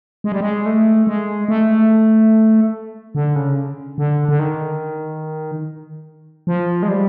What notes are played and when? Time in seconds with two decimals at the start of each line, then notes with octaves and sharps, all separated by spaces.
0.24 G#3
0.32 G3
0.41 G#3
0.66 A3
1.07 G#3
1.48 A3
3.15 D3
3.36 C#3
3.98 D3
4.29 D3
4.39 D#3
6.47 F3
6.83 G#3
6.88 G3